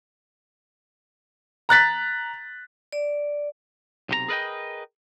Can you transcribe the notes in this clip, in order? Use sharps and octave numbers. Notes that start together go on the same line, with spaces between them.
A#5 F#6 A6 B6
D5
B1 C3 G4 A#5
G#4 A#4 B4 D5 D#5 G5